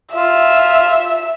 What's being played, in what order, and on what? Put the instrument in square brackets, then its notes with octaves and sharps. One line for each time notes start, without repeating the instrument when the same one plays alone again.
[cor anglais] F4 [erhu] E5